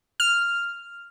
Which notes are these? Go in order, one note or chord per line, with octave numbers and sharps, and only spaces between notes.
F6